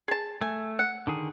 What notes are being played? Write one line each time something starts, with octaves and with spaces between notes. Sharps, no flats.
G#4 A5
A3 G#5
F#5
D3 D#3 G#4